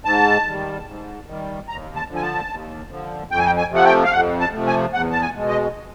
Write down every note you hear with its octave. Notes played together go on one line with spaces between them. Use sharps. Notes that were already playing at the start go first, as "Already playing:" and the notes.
G#2 A5
D#3 G3
G#2
D#3 G3
D#2 A#5
A5
D3 F3
G#5
A5
D#2
D3 F3
F2 G5
G#5
G5
G#5
C3 F3 A3 F#5
G5
F5
F2 F#5
A5
C3 F3 A3
G#5
E2 F#5
A5
G#5
B2 G#3
D#5